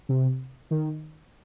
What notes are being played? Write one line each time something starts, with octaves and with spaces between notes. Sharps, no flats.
C3
D#3